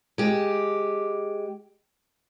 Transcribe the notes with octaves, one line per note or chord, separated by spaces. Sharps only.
G#3 G4